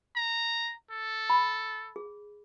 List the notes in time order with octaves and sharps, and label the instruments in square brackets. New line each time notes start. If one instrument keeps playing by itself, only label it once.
[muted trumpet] A#5
A4
[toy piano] B5
G#4